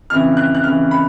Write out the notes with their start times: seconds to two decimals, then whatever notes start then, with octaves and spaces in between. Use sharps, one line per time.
0.10 F2 C#3 E3 F6
0.37 F#6
0.55 F#6
0.64 F2 C#3 E3 F6
0.91 B5